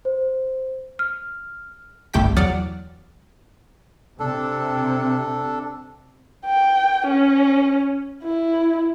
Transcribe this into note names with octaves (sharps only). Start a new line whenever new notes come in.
C5
F6
G1 C2 A3 G4 G5 B6
E2 F#3 D5 F#5 D#6 F6
C3 D4 A4
G5
C#4
E4